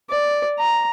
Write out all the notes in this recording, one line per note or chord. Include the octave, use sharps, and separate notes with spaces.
D5
A#5